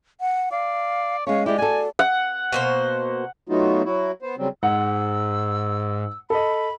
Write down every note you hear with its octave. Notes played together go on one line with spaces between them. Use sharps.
F#5
D5 F5
G#3 B3 C#4 C#5 F5
G#3 E4 G4 D5
F#4 A4 G#5
F#5
B2 A#3 C5
F#3 A3 B3 D#4 F4 F#4
F#3 E4 F#4
B3 C5
C#3 F#3 G3 C4
G#2 F#5 E6
A4 D#5 B5